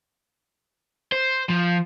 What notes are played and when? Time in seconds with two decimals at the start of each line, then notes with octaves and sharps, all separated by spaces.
1.12 C5
1.49 F3